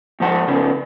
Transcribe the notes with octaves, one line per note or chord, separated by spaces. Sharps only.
G#2 F3 F#5 A5
C#3 F3 B3 C#4